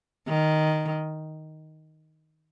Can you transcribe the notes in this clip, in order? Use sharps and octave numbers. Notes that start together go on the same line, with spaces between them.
D#3